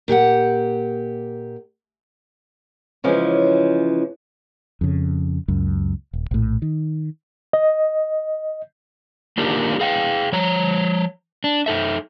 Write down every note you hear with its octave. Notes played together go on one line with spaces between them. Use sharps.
A#2 G4 G#4 F#5
C#3 E3 F3 G#3 C#4
F2 C#3
C#2 F#2
D#1
A#1 A2
D#3
D#5
A#3 D4 D#4 F4 G4 A#4
G#4 F5 G5
F3 C#5 A#5
D4
D#4 A4 E5